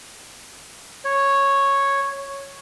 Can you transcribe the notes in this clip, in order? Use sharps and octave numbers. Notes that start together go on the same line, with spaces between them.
C#5